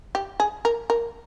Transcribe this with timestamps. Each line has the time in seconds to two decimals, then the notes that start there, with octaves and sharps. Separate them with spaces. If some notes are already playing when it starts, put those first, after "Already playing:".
0.15 G4
0.40 G#4
0.65 A#4
0.90 A#4